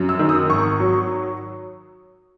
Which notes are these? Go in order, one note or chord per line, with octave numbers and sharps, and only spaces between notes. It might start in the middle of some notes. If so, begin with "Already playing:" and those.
Already playing: F#2
E6
D#3
D#6
G#1 C#6
F#3